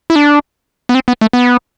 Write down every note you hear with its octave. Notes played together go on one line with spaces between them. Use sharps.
E4
D4
B3
C4
B3
A3
B3